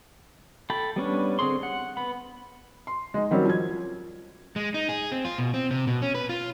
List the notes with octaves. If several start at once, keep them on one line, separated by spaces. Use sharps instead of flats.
A4 G5 A5 B5
G3 B3 C#4 D4
D3 C4 G#4 C6
F#5
B3 B5
C6
G#3 D#4
D#3 F#3 G3 C4 C#4
F3 G#6
G#3
D#4
G#4
C4
F4
B2
C4
C3
B2
C#4
B4
F4